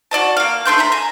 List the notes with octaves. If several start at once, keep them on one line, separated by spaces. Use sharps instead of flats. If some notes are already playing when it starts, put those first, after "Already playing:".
F#4 D5 D#5 A5
A#3 F5
A3 D4 C6 G6
E5 A#5 B5
G#5 A#5